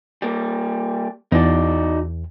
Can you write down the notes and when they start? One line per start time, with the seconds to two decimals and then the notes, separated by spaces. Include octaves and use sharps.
0.22 G3 A#3
1.32 E2 D#4 F#4 D5